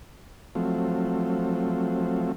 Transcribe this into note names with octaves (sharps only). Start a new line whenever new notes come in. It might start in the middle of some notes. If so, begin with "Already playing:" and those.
F3 F#3 A3 C4